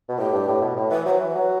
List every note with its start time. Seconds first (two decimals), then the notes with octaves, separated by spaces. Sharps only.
0.09 B2
0.19 A2 G4
0.33 G2
0.48 A2
0.62 B2
0.76 A2
0.91 E3 B4
1.06 F#3 C5
1.10 B4
1.20 E3
1.35 F#3